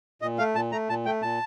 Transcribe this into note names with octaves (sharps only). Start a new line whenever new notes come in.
A#2 D#5
A3 F5
A#2 A5
A3 A#5
A#2 A5
A3 G5
A#2 A5